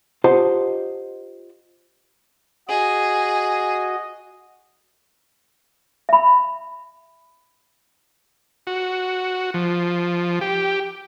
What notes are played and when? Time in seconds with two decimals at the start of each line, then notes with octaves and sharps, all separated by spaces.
0.24 F4 G4 C5 D#5 F#5 A5
2.69 F#4 G#4 D#5
6.09 E5 B5
8.67 F#4
9.54 F3
10.41 G4